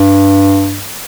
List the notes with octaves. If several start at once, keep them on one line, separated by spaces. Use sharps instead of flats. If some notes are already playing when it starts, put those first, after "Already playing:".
Already playing: G2